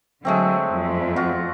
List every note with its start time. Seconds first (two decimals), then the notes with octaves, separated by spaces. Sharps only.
0.25 D3 F#3 G#3 A3 C4
0.72 F2
1.16 F4 F#4